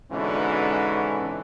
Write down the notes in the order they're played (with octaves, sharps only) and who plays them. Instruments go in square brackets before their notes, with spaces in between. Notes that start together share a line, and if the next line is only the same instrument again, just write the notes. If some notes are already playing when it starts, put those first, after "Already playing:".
[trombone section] G#2 B2 D3 E3 C#4